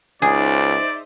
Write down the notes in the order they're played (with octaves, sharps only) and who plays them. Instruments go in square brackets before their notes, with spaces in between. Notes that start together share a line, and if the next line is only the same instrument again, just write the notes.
[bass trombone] C#2 [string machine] D#4 C5 E5 [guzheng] G#4 [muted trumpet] D5